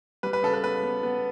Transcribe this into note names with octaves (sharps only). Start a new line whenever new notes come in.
G3 B4
B4
C#3 A4
B4
B3 B4
B3
B3